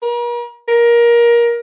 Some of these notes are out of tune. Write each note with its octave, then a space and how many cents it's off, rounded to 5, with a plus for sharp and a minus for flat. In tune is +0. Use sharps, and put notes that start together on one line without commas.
A#4 +45
A#4 +20